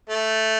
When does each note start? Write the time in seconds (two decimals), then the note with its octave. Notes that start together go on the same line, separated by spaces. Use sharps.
0.09 A3